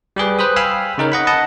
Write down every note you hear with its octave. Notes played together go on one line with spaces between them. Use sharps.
G3 G4 G#4 B4
B4 C5 B5 D#6
F5 G5 G#5 B5 E6 F6
C#3 D#4 A#4 C#5
D#5 F#5 B5
D#5 F#5 A5